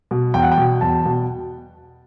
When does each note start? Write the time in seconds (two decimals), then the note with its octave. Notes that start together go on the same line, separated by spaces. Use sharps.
0.11 B2
0.34 E2 G5
0.43 F#5
0.52 G5
0.58 B2
0.81 E2 A5
1.06 B2